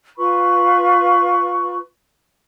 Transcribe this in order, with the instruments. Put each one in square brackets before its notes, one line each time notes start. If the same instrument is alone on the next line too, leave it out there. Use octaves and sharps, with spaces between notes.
[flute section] F4 B4 B5 C#6